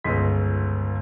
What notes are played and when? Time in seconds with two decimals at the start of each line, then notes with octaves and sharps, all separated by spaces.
0.04 G1 C#2 D#5 C6 B6